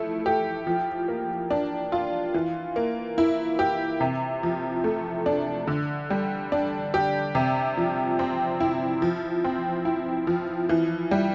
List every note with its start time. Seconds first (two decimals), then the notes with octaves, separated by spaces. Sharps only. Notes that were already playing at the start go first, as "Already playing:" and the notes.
Already playing: F3 A3 E4
0.26 G4
0.67 F3
1.08 A#3
1.51 D4
1.92 F4
2.34 E3
2.76 A#3
3.18 E4
3.59 G4
4.00 C3
4.43 F3
4.84 A3
5.26 D4
5.67 D3
6.10 G3
6.52 D4
6.94 G4
7.35 C3
7.77 F3
8.19 C4
8.60 E4
9.02 F3
9.44 C4
9.85 E4
10.27 F3
10.69 E3
11.11 G3